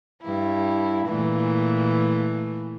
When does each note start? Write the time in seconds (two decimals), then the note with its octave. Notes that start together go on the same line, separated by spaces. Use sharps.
0.22 G2 E4
1.07 A#2 E3 A3